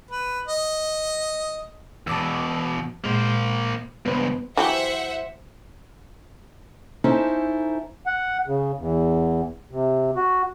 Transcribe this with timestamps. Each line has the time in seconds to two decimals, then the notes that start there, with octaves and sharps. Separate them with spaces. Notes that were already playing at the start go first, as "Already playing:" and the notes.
0.11 B4
0.47 D#5
2.07 E2 B2 A5 D6 E6
3.04 A#2 G#3 A#3 C5
4.06 C#2 G2 B3 B4 C5
4.57 E3 F#3 G4 C5 E5 F#5
7.04 C#4 D#4 E4 A4 C5
8.07 F#5
8.47 C#3
8.78 E2
9.71 C3
10.16 F#4